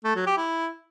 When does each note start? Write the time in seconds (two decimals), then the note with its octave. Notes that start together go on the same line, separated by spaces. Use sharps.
0.05 A3
0.16 F#3
0.27 G4
0.38 E4